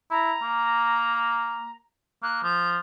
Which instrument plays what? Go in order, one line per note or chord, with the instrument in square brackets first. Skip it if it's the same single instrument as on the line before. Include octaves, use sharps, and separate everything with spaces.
[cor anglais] E4 [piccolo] A#5
[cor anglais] A#3
[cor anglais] A#3 [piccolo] F#6
[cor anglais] F3 [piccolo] G6